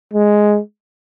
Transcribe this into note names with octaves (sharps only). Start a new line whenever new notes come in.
G#3